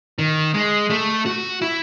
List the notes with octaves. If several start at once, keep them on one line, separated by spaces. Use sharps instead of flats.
D#3
G#3
A3
F#4
E4